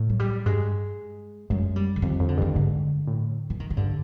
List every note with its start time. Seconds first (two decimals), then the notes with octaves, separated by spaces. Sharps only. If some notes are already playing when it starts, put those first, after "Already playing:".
Already playing: A2
0.10 F#3
0.19 G3
0.46 G2 G#3
1.50 F#2 G#3
1.76 G3
1.96 D3
2.02 F2 D#3
2.20 F2
2.28 D3
2.38 G2 D#3
2.55 G#2 D3
3.08 A2
3.50 E3
3.60 D#3
3.70 D#3
3.77 G2 D3